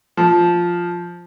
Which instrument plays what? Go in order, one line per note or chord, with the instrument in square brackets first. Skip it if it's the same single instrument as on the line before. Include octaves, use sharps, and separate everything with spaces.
[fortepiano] F3